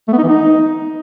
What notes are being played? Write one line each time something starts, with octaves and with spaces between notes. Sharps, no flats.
A3
B3
D#4
E3
D#4